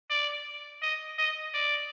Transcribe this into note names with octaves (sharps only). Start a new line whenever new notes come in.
D5
D#5
D#5
D5